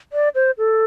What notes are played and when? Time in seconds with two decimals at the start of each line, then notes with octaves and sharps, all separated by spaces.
0.13 D5
0.35 C5
0.58 A4